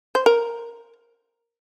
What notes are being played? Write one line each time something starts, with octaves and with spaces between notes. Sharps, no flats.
C5
A#4